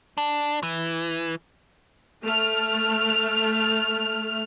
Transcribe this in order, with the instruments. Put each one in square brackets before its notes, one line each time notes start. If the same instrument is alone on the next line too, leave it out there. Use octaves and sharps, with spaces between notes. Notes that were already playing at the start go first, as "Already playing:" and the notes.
[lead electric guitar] D4
E3
[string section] A3 F6